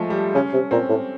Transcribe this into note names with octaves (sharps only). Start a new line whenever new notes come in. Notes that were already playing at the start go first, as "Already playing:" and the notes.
Already playing: F3 G#3 A3
G3
C#3 C#4
C3
A#2 C4
A2